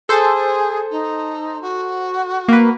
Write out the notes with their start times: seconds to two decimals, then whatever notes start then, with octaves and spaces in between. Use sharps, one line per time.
0.09 G#4 A4 C5
0.91 D#4
1.62 F#4
2.48 A#3 B4